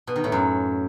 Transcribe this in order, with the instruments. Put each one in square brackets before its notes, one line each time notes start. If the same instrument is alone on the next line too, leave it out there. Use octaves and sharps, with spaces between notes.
[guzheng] B2
D#3
A2
F#2